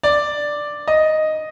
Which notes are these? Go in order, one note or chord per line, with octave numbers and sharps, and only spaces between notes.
D5
D#5